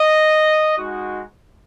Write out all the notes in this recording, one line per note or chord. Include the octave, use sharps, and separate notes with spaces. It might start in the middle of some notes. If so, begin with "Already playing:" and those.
Already playing: D#5
G#3 D#4 F#4